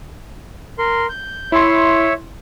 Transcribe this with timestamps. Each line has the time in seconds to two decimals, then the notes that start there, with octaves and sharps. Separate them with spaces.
0.79 A#4 C6
1.09 G6
1.52 E4 C#5 E5 C6